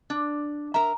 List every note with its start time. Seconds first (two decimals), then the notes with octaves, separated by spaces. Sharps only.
0.10 D4
0.74 A#4 E5 A#5